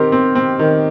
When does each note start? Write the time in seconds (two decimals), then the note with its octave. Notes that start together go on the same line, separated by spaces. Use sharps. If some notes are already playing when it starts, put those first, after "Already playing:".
Already playing: D#3 C4 G4 A#4
0.12 C4
0.35 C4
0.59 D#3